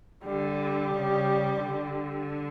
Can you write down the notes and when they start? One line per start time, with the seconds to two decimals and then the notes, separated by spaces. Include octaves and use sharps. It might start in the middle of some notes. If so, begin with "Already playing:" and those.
0.23 D3 G3
0.93 C#3
1.63 D3